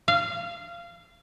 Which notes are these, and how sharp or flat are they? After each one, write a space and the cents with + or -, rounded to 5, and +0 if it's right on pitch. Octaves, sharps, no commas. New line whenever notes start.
F5 -20